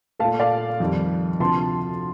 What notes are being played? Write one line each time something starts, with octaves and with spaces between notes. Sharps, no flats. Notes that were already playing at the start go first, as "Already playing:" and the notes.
A#2 A3 F5 A5
D5 F5
F2 D#3 G3
D2 C3 F3 A5 C6